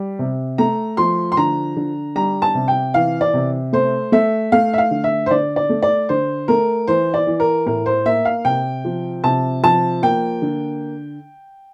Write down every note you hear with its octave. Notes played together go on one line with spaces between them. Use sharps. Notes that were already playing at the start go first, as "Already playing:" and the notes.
Already playing: G3
C3
A3 A#5
F3 C6
C6
D3 A#5
D3
G3 A#5
A5
C3
G5
E3 F5
D5
C3
A3 C5
A3 E5
A3 F5
E5
F5
D3
E5
C5
D3 D5
D5
A3
D5
D3 C5
A3 A#4
E3 C5
D5
E3
A#4
A2 A#4
C5
A#3 E5
F5
C3 G5
F3
C3 A5
F3 A5
A#3 G5
D3